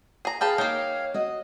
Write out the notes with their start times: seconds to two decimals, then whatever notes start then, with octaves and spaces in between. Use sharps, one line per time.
0.25 G#4 A#5
0.41 G#4 B4 F5 G5 A5
0.58 A#3 D#4 C#5 G5
1.14 F#4 D#5